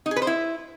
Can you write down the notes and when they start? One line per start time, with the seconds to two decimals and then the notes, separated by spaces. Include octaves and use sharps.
0.06 D#4
0.11 G#4
0.16 B4
0.22 C5
0.27 E4